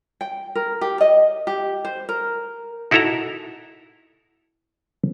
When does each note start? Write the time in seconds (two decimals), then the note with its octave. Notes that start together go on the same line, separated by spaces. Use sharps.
0.21 G5
0.55 A#4
0.81 G4
1.01 D#5
1.47 G4
1.85 C5
2.09 A#4
2.91 D#4 E4 F#4 A4 E5 A#5